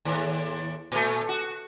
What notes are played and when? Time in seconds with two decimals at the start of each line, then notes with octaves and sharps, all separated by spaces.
0.05 D#2 A2
0.92 A#2 A3
1.29 F#4